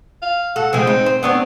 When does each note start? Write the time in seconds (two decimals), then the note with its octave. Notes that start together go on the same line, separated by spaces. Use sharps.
0.22 F5
0.56 A4 F#5
0.73 C#3 F3 G#3 C4
0.87 D#4
1.06 C5
1.23 B3 C4 D4 C#5